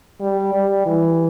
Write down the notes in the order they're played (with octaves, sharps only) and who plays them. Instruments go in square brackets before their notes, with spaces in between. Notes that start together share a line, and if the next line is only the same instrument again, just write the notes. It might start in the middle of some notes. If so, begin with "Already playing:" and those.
[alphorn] G3
G3
E3